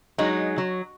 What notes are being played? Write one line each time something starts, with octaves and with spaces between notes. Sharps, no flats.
F#3 G#3 D#4
F#3